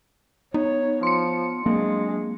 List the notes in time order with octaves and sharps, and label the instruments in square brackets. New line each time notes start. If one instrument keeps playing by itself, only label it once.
[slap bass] B3 [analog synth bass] D#4 [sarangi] C#5
[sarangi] F3 [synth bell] C6 C#7
[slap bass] F#3 C4 D4 [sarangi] G#3 [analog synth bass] A#3